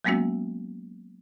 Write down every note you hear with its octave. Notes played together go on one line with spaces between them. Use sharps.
F#3 G#3 A#3 B3 C#4 F#4